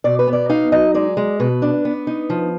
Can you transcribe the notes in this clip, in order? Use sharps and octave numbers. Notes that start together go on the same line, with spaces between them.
B2 D5
B4
B3
D5
D#4 F5
F#3 D#5
G#3 D5
G#3
B2 B4
D4
B3
D#4
F3